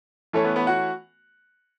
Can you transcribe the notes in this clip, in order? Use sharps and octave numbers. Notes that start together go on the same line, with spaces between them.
E3 A3 C#4 A4
B3 B4
B3 B4
F#4 F#5